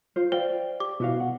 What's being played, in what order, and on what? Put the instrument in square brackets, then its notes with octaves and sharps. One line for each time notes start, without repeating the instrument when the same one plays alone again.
[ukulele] F4 C5
[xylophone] C5 [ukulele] D5 F5 [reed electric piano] G5
[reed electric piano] G4 [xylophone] D6
[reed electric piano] B2 [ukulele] E4 F#4 F5
[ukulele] F#5